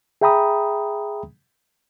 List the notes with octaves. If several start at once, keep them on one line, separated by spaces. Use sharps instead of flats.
G#4 E5 G5 A#5 B5 D#6